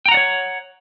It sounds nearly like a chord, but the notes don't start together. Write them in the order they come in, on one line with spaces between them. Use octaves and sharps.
G5 A#5 F#5 D5 C#5